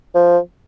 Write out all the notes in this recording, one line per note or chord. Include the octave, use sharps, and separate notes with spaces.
F3